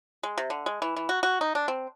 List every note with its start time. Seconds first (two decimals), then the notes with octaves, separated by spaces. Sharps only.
0.23 G#3
0.38 C3
0.50 D3
0.66 G#3
0.82 E3
0.96 E3
1.09 F#4
1.23 F#4
1.41 D#4
1.55 D4
1.68 C4